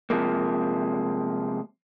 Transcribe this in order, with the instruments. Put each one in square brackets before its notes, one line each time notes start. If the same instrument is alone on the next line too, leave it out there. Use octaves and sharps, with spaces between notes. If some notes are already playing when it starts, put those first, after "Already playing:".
[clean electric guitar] C3 F3 G#3 A#3